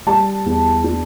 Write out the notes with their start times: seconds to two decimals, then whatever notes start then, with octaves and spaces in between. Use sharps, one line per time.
0.07 G3 A5
0.46 E2
0.84 D4